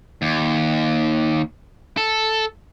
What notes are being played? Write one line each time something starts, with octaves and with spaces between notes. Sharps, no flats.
D#2
A4